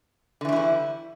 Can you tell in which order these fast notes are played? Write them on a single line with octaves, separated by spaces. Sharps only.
D3 E3 A3 E4 G3